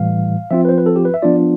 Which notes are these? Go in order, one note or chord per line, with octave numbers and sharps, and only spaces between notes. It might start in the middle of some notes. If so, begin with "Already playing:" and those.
Already playing: A2 E3 G3 F5
F3 C4 F4 E5
B4
C5
B4
A4
G4
B4
E5
F3 B3 D4 F4 D5